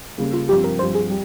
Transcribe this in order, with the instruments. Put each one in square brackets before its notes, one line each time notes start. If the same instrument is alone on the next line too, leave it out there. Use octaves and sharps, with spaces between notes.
[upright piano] C#3 G3 A#3
[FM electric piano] F4
[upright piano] G2 F3 C4 [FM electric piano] G4
[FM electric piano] A#4
[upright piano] G2 F3 C4 [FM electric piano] C5
[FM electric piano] G#4
[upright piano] G3